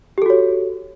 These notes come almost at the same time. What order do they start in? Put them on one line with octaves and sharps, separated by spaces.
G4 A4 F#4 C#5